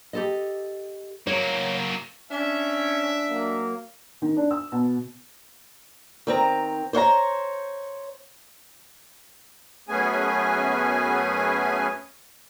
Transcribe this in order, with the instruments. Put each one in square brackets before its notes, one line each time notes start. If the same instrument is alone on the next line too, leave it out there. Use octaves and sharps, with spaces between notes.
[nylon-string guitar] G4 A4 D#5
[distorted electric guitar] F#3 A#3 [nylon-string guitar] C#5
[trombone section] C#4 [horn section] D4 E5
[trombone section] F#3 A#3
[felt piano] D#3
D4
E6
B2
[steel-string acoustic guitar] D#3 C4 A#5
C5 C#5 F5 A#5
[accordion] F#2 A3 B3 C#4 G#4 G#5